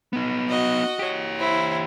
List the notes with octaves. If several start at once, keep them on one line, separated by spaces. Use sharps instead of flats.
B3 D#4
F#4 D#5
G4 C#5
E4 C5